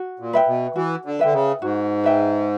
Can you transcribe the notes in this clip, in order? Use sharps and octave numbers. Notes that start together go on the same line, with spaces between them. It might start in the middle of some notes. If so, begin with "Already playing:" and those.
Already playing: F#4
A#2
B4 E5 G5
B2
E3 F#4
D3
D3 B4 E5 G5
C#3
G#2 F#4
B4 E5 G5